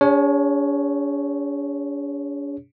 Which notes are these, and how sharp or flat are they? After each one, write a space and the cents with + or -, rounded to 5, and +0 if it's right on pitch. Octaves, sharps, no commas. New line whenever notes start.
D4 -45 G#4 -40 C#5 +0